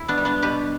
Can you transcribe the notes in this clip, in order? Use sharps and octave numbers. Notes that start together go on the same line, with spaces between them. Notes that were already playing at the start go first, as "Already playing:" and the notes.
Already playing: E4
B3 D4
G3
B3 D4
B2 G4 B4